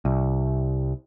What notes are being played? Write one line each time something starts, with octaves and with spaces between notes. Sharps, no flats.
C2